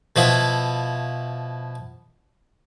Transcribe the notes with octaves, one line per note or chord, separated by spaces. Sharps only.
B2 F3 E4